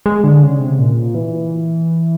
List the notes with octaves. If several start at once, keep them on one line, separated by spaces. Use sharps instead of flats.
G#3
D3
C#3
C3
A#2
E3